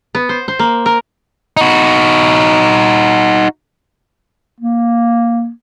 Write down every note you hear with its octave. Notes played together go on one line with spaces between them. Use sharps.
B3
C5
C5
A#3
A#4
D#4 F#4
A#3